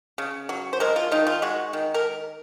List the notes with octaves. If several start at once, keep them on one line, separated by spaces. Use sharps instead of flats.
C#3
F#3
C5
G#3 A#4
F4
D#3 D#4
F4
G#3 F#4
D#3
A#4